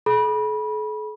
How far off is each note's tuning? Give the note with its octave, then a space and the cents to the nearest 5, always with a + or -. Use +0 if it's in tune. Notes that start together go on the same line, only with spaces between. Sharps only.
A4 -45 B5 -25